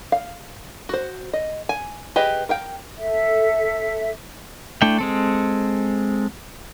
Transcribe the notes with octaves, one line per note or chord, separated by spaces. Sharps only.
F5
F#4 C5
D#5
G#5
G4 G#4 B4 D#5
A#4 F5 G5
A4 E5
A3 D4 E4 G5
G#3 C4 A4